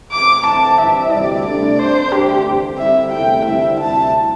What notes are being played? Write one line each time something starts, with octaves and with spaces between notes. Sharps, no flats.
A2 E3 C4 D6
G2 D3 C4 E4 A5
G2 E3 C4 E4 E5
D2 C3 G3 D5
C3 A3 D4 D5
G2 G3 D4 C5
D2 C3 E3 A3 D4 G4
G2 D3 C4
D3 G3 C4 E4 E5
E2 C3 A3 E4 G5
D3 G3 C4 E4 E5
D2 C3 G3 E4 A5